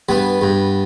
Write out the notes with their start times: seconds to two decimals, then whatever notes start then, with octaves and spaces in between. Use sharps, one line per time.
0.09 G2 B3
0.41 G2